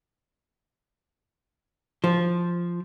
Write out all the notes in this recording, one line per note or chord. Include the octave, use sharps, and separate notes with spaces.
F3